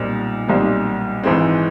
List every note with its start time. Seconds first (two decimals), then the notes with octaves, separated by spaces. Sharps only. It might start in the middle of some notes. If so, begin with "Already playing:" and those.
Already playing: B1 A#2 G3 C4 D#4
0.48 B1 A#2 G3 C4 D#4
1.24 G#1 G#2 E3 G#3 C4